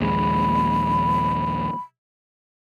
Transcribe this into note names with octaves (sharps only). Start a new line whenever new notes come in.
A#1 D#2 G#3 B5